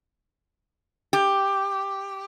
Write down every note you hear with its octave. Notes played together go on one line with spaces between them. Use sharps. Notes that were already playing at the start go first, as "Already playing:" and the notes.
G4